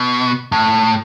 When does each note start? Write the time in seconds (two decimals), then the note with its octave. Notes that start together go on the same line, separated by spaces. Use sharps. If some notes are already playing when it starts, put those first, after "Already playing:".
Already playing: B2
0.52 A2